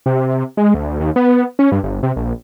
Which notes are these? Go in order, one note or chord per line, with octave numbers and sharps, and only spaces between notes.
C3
G#3
D2
D#2
B3
C#4
G2
G1
C3
A#1